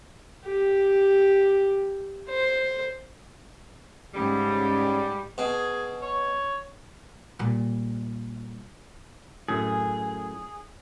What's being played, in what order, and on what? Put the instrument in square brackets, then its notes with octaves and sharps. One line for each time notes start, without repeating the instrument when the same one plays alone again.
[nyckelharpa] G4
C5
[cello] G#2 [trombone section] C#3 C#4 [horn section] G3
[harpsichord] B2 [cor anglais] G#4
[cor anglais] C#5
[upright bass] A#2 G3
[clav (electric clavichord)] F#2 A2 [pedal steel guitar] G#4